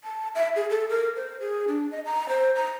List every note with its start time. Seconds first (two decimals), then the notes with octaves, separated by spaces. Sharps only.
0.04 A5
0.35 E5
0.56 G#4
0.70 A4
0.89 A#4
1.16 C5
1.40 G#4
1.68 D4
1.91 D#5
2.06 A#5
2.29 C5
2.55 A#5